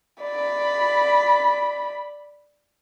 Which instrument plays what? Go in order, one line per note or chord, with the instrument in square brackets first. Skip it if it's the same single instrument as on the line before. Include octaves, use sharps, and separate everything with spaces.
[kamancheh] D5 B5